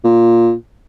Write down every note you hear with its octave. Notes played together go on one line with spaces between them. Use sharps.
A#2